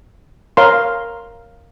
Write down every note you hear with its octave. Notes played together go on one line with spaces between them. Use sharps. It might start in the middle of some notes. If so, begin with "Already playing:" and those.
A#4 C#5 F5 C6